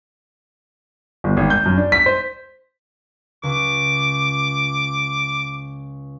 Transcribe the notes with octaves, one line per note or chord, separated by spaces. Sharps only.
G1
G#1
G6
F#2
D4
B6
C5
C#2 D6